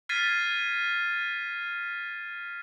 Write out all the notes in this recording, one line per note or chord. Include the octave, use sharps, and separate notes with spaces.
F6 G#6 A6 B6 C7 D#7